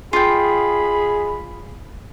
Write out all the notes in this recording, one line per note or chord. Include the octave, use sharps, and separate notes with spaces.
F4 G#4 D#5 G5 B5